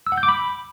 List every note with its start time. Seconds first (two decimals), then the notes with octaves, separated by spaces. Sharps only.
0.07 E6
0.12 F#5
0.18 G6
0.23 D6
0.29 B5